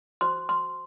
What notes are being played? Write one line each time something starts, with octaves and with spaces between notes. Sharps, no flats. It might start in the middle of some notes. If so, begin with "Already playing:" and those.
F#4 C5 C6
C6